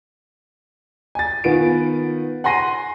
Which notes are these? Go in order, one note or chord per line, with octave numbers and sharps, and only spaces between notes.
G#5 A6
D#3 B3 F4 D7
F#5 G#5 C6 A#6 C7 D#7